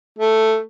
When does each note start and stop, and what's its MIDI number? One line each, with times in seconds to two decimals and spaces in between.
0.19 0.58 57